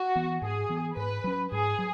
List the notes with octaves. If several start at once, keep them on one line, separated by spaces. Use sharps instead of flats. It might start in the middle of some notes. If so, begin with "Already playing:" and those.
Already playing: F#4
E3 B3
G#2 G#4
E3 B3
G#2 B4
F#3 C#4
G#2 G#4
F#3